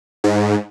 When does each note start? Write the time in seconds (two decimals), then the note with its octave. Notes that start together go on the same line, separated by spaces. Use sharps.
0.24 G#2